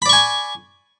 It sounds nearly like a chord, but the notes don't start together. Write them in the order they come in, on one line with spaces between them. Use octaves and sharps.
B5 D5 C#6 G#5